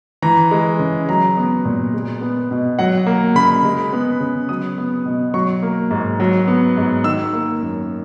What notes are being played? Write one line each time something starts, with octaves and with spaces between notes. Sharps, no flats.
E3 A#5
G#3
C#3
F#3 A#5
B3
A#2
G#3
B3
B2
F#3 F#5
A#3
C#3 B5
G#3
B3
C#3
F#3 D#6
B3
B2
F#3 C#6
A#3
G#2
F#3
B3
G#2
D#3 E6
A#3
F#2